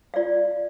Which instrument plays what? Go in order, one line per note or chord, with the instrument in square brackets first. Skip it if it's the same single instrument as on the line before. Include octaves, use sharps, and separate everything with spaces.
[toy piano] F4 D5 F5